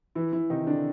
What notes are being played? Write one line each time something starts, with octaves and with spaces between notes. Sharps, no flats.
E3 E4
E3 E4
C3 D#3 D#4
D3 D4